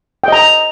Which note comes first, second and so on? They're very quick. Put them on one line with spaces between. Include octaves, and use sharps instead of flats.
G5 D#5 A#5